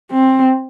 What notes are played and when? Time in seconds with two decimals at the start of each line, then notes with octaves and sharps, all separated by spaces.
0.12 C4